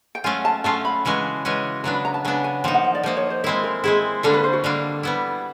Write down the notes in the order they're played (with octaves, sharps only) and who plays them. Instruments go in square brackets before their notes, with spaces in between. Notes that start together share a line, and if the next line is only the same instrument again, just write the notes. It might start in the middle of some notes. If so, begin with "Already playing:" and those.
[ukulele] G5
[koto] F#3 A3 C#4 F4 [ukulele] G#5
[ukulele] A5
[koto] F#3 A3 C#4 F4 [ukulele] A5
[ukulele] B5
[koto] C#3 E3 G#3 C#4 F#4
C#3 E3 G#3 C#4 F#4
[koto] C#3 F#3 B3 D4 [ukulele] A#5
[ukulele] B5
A#5
A5
[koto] C#3 F#3 B3 D4 [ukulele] G#5
[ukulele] G#5
[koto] F3 A#3 D#4 [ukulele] G5
[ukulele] F#5
D#5
D5
[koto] F3 A#3 D#4 [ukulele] C5
[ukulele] C#5
C5
[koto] G#3 C4 E4 [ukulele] A#4
[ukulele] A#4
[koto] G#3 C4 E4 [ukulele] G#4
[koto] D3 G3 A#3 D4 [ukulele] A4
[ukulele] B4
C5
F#4
[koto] D3 G3 A#3 D4
G3 B3 E4